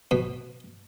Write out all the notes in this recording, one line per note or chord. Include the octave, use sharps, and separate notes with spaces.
B2